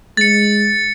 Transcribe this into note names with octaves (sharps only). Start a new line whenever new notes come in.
G#3 A6 C#7